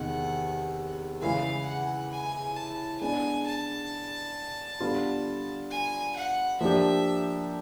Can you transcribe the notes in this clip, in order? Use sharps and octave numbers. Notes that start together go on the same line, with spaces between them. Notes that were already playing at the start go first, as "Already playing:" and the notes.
Already playing: E2 C3 D#3 F#5
C#3 E3 G#3 F5
F#5
G#5
A5
G#3 B3 D4 G#5
A5
D3 G3 B3 D4 F4
G#5
F#5
F3 A#3 D4 G4 E5